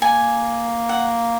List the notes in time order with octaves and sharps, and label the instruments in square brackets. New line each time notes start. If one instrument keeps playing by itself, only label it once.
[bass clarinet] A#3 [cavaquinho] G#5
[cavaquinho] F#5